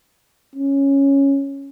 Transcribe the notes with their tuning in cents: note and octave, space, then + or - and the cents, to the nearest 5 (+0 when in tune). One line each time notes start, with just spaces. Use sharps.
C#4 -5